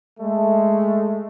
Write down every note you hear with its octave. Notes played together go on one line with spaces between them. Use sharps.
G#3 A3